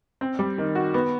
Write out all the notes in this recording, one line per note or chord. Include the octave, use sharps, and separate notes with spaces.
C4
G3
D#3
F#4
B3